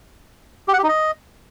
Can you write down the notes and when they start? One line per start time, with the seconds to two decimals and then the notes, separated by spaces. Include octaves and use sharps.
0.68 G4
0.73 F#5
0.78 G4
0.83 D#4
0.89 D#5